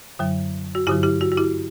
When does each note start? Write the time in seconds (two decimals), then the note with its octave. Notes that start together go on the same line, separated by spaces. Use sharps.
0.19 F#2 D3 F#3
0.75 F#4
0.87 G2 D3 F#3 E4 G4
1.03 E4 G4
1.21 F#4
1.32 F#4
1.37 E4 G4